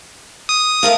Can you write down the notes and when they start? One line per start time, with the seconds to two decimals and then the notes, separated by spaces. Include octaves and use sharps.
0.49 D#6
0.83 A3 A#4 F5